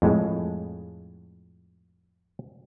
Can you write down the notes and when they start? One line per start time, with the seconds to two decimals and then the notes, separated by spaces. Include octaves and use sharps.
0.02 F2 A2 G#3